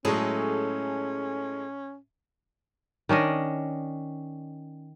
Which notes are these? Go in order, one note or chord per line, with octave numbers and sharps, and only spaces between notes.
A2 F#3 G#3 C#4 G#4 A4 C#5
D#3 C#4 D4 D#5